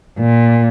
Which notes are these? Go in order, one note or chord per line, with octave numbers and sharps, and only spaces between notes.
A#2